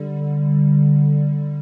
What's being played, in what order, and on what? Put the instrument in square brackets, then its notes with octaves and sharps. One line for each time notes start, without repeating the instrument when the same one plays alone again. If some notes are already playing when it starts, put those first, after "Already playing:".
Already playing: [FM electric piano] D3 G3